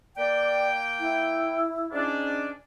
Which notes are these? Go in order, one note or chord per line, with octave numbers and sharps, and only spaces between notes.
A#3 D5 G5
E4
G#2 C#4 D4